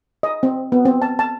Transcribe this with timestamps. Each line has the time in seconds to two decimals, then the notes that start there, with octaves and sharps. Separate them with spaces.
0.23 D#5
0.43 C4
0.72 B3
0.85 C4
1.02 A5
1.19 A5